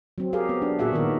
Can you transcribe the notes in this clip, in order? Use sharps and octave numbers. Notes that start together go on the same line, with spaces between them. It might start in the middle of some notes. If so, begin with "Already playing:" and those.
F#3 C4
G4 G#4 A#4 F5
B3
D4
A#2 F#4 G#4 E5 F#5
A#2 D#3 B3 A#4